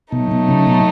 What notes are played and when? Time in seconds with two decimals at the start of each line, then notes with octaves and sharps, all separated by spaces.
0.12 B2 F#3 A3 D#4
0.31 B2
0.49 C#3
0.67 B2